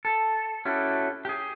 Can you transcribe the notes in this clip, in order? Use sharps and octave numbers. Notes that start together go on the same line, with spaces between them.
A4
C#4 E4 F#4 G4 A4
G4 G#4